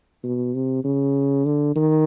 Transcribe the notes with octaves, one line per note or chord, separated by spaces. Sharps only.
B2
C3
C#3
D3
D#3